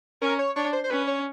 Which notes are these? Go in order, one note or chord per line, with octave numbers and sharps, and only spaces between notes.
C#4 A#4
C#5
D4 C#5
C5
C5
C#4 B4
C#5